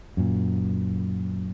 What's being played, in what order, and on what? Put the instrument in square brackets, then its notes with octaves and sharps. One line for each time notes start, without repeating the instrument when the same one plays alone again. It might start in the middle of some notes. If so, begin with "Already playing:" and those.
[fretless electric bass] F#2 A#2